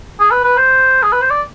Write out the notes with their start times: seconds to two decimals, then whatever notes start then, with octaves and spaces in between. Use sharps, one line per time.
0.20 G#4
0.31 B4
0.44 B4
0.57 C5
1.03 G#4
1.12 B4
1.21 C5
1.31 D5